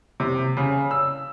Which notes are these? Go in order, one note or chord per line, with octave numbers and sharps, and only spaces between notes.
C3
C#3
E6